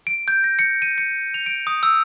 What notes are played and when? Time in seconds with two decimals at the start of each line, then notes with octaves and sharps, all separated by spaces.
0.07 D7
0.28 G6
0.44 A#6
0.59 C#7
0.82 D#7
0.98 C#7
1.34 F7
1.46 D7
1.67 D#6
1.83 E6